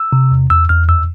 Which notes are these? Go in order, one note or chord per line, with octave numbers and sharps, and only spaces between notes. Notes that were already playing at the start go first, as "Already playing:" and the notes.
Already playing: E6
C3
E2
E2 E6
E2 F6
F2 E6